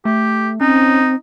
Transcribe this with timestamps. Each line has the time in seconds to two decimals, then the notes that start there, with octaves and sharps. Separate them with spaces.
0.05 A3 G4
0.61 C4 C#4 D#4